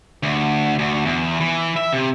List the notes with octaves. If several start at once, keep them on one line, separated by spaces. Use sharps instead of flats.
D2
D2
E2
E3
E5
C3